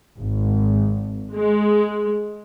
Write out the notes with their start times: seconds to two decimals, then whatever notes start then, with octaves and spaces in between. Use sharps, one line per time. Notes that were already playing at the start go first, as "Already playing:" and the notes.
0.19 G#1
1.33 G#3